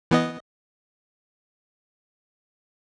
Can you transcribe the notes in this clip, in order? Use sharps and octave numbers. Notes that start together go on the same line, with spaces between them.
E3 B3 D#5